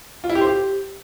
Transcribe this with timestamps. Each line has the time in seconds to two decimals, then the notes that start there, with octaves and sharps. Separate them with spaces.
0.24 F4
0.30 E4
0.35 G4
0.41 C5
0.47 G4